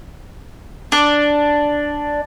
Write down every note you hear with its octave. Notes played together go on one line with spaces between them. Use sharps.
D4